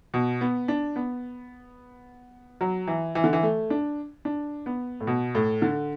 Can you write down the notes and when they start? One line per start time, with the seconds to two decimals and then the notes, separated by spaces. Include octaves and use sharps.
0.14 B2
0.41 B3
0.68 D4
0.96 B3
2.61 F#3
2.87 E3
3.15 E3
3.24 D3
3.33 E3
3.43 A3
3.70 D4
4.25 D4
4.66 B3
5.00 A2
5.07 B2
5.35 A2
5.62 D3